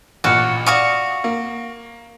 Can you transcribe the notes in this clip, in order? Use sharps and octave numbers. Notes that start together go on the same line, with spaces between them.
A1 A#2 F#4 F5 F#5
F#4 D5 F5 C#6 D#6
A#3